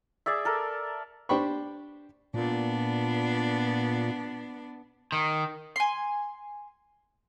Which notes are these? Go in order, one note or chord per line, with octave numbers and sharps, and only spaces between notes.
G#4 D5 E5
A4 A#4
D4 G4 C5 G5 B5 C#6
A#2 B3 D4
D#3
G#5 C6